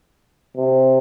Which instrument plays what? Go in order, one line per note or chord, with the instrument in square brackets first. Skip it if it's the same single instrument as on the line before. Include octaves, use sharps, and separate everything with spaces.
[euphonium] C3